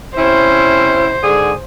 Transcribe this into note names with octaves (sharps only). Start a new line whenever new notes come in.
C3 C#4 E4 C5
G#2 D3 G#4